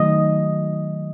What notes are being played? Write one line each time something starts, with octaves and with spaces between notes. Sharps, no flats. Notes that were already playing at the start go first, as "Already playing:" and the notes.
Already playing: D#3 F#3 A3 D#5